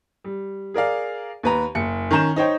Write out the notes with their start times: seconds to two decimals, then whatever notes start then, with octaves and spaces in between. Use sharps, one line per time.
0.24 G3
0.74 G#4 A#4 D5 F5
1.43 D#2 B4 A#5
1.75 F#1 C#7
2.11 D#3 C#4 A#5 G6 E7
2.36 D#4 C5 C#5 G5